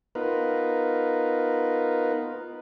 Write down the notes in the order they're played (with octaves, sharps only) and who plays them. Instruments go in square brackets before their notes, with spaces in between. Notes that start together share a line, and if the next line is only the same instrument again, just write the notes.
[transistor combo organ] B3 D#4 F4 A#4 B4